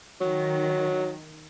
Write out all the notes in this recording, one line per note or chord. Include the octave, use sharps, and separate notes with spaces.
D#3 F#3